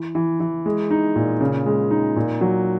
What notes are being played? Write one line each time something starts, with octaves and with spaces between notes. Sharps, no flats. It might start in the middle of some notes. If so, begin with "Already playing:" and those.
Already playing: E3
E3
E3
G#3
D#4
A#2
C#3
G#3
D#4
A#2
F#3